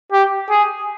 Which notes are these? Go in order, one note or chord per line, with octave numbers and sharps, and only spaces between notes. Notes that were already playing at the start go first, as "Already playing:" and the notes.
G4
G#4